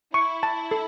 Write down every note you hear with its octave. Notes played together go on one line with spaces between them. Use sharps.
E4 C#6
A5
A4